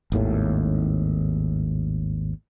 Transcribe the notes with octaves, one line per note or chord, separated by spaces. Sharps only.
G#1 D#2 A2